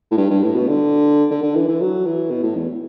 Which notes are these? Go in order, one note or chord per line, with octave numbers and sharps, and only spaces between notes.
A2
G2
G2
A2
B2
D3
D3
D3
E3
E3
F#3
E3
B2
A2
E2